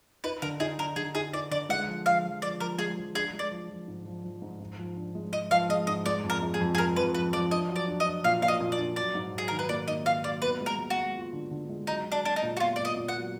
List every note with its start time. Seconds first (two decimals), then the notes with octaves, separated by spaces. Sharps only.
0.24 D#4 B4
0.42 D3 A#4
0.60 D#4 G#4
0.78 D3 A#4
0.96 D3 G#4
1.15 D#4 G#4
1.33 D#4 D5
1.51 D3 D5
1.69 G#3 F#5
1.88 F3
2.06 F3 F5
2.24 F3
2.42 F3 D5
2.60 F3 A#4
2.78 G#3 G#4
2.97 F3
3.14 D4 G#4
3.33 G#3
3.39 D5
3.51 F3
3.69 F3
3.88 G#2
4.06 F3
4.24 F3
4.42 G#2
4.60 G#2
4.78 F3
4.97 D4
5.15 G#3
5.33 G#3 D#5
5.51 F3 F5
5.69 G#3 D#5
5.87 G#2 D#5
6.06 G#3 D5
6.24 F2
6.30 A#4
6.42 G#3
6.54 G#4
6.60 F2
6.75 G#4
6.78 F2 A#4
6.96 F2 B4
7.14 F3 B4
7.33 F3 D5
7.51 D4 D#5
7.69 F#3
7.76 D5
7.88 D4
8.00 D#5
8.06 D4
8.24 A#2 F5
8.42 A#2 F5
8.48 D#5
8.60 A#2
8.72 D5
8.79 D4
8.96 F#3 D5
9.15 G#2
9.33 F#3
9.38 G#4
9.48 D#3 A#4
9.59 B4
9.69 A#3 D5
9.88 D#3 D#5
10.06 A#3 F5
10.24 F#3 D5
10.42 B3 B4
10.61 G#3
10.66 A#4
10.79 G#3
10.90 F#4
10.96 G#3
11.15 F4
11.33 D3
11.51 D3
11.69 G#3
11.87 F#3 D#4
12.06 F#3
12.12 D4
12.24 F#3 D4
12.36 D#4
12.42 A#2
12.57 F#4
12.60 B3 F4
12.76 A#2 D5
12.85 D#5
12.97 A#2
13.08 F#5
13.15 F#3